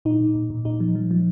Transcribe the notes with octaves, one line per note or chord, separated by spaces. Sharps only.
A#2 D#4
A#2
A#2
A#2
A#2 D#4
F3
F3
F3